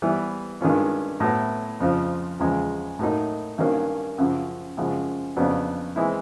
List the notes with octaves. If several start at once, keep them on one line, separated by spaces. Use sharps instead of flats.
E3 G3 B3 E4
G2 D#3 G#3 C#4 F4
A2 F#3 B3
F2 C#3 F3
E2 C#3 F3 G#3
A2 F#3 A#3 D#4
G2 D#3 F#3 A#3 C#4
F#2 C#3 F3
F#2 C#3 F3 G#3
F2 C#3 F#3 B3 D4
E3 G#3 C4 E4